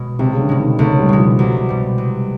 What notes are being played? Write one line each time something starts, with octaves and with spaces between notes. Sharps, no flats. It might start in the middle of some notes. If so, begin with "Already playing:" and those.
Already playing: B2 G#3
C#2 C3
C#3
D3
B2 G#3
D#3
C#2 A3
G3
B2 G#3
F3
C2 F#3
B2 G3
C2